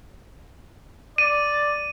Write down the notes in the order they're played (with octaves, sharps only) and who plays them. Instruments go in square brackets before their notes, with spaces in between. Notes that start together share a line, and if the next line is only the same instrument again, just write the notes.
[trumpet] D5 [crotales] D#7